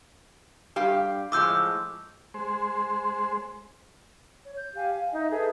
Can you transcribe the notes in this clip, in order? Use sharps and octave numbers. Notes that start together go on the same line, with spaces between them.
G2 G4 F5
A2 F3 G#3 D6 E6 G6
G#3 C5
C#5
G6
G4 F5 G#5
F5
D#4 D#5 E5
G#4 A4 B4 E5